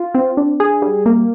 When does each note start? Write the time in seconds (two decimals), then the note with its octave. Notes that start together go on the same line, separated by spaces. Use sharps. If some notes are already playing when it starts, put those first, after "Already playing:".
Already playing: F4
0.15 C4
0.37 D4
0.60 G#4
0.82 G3
1.06 A#3